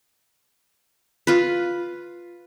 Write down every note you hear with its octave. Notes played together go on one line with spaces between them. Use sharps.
F4 B4